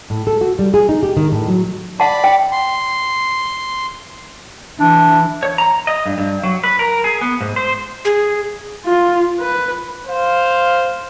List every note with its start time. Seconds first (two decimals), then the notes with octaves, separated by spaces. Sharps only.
0.10 A2
0.27 A4
0.41 F#4
0.59 G3
0.74 G#4
0.89 D#4
1.03 G4
1.17 D#3
1.32 A2
1.48 F#3
2.00 D5 F#5 A5 B5
2.24 G5
2.52 C6
4.80 E3 D4
5.43 C#5
5.58 A#5
5.87 D#5
6.06 G2
6.18 G2
6.43 F#3
6.64 B4
6.79 A#4
7.04 G#4
7.21 B3
7.41 G#2
7.56 C5
8.05 G#4
8.85 F4
9.41 B4
10.08 C5 F5